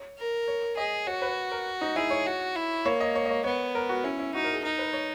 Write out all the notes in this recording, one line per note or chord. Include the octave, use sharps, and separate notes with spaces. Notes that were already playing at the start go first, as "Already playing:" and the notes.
Already playing: C#5
A#4
C#5
G#4 D#5
F#4 C#5
B4
A#4
D#4
E4 G#4
C#5
F#4
E4
A#3 C#5
D#5
C#5
D#5
C#5
B3 C#5
A#4
F#4
C#4 E4
E4
D#4 F#4
A#4
G#4
D#4 A#4
B4
C#5